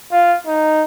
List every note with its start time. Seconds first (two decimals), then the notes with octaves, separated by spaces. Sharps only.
0.12 F4
0.46 D#4